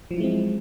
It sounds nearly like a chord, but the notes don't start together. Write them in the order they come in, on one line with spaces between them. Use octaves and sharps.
F3 F#3 E4 G#3 C4